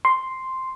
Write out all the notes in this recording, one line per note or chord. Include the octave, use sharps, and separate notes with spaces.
C6